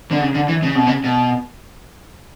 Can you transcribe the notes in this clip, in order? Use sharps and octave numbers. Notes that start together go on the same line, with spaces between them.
D3
C#3
D3
E3
C#3
B2
C#3
B2